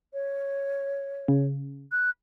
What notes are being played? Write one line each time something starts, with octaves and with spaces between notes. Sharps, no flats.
C#5
C#3
F#6